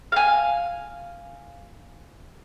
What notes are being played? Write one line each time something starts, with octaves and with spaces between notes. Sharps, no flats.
F5 G#5